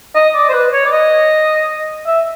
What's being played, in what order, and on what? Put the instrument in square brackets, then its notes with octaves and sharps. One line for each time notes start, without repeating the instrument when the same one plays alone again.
[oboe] D#5
D5
C5
B4
C#5
D5
D#5
E5